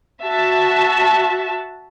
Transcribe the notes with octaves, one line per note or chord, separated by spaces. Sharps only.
F#4 E5 A5